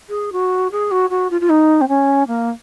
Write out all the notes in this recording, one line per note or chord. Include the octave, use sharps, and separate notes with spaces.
G#4
F#4
G#4
F#4
F#4
F4
F4
D#4
C4
C#4
A#3